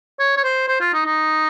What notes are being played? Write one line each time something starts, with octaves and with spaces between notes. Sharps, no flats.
C#5
C#5
C5
C5
F4
D#4
D#4